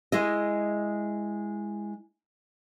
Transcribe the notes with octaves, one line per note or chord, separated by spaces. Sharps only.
G#3 E4 D#5